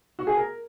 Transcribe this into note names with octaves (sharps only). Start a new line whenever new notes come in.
F#4
G#4
A#4